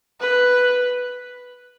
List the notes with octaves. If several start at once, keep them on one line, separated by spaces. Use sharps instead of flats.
B4